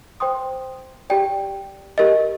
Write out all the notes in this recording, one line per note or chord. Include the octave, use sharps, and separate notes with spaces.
C5 G5 C6 D#6
G4 D5 G5
G4 A#4 D#5